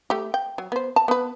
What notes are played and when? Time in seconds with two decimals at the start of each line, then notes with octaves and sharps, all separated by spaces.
0.10 A3 G4
0.34 G5
0.58 F#3
0.72 B3 C5
0.96 A5
1.08 B3 B4